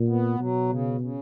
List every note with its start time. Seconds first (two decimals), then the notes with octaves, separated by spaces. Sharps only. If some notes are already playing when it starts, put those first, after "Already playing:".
Already playing: A#2
0.08 B3
0.39 B2 F#3
0.69 C#3
1.01 C#3